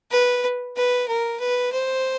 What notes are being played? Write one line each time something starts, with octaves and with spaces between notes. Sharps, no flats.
B4
B4
A#4
B4
C5